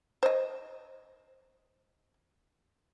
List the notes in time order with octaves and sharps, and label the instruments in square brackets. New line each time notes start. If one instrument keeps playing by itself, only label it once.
[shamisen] C5 D#5